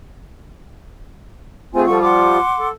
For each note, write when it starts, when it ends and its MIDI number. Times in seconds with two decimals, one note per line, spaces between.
1.74 1.86 57
1.74 1.86 60
1.74 1.86 65
1.74 1.85 68
1.74 1.85 72
1.74 1.85 80
1.87 2.38 53
1.87 2.38 55
1.87 2.38 65
1.87 2.01 69
1.87 2.01 78
1.87 2.01 85
2.03 2.68 78
2.03 2.68 84
2.03 2.68 86
2.59 2.72 69